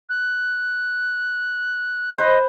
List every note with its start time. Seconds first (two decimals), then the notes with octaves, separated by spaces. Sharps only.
0.09 F#6
2.18 B4 C5 D#5